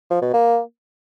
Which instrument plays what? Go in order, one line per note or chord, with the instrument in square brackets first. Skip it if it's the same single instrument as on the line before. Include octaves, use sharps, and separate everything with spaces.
[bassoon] F3
B2
A#3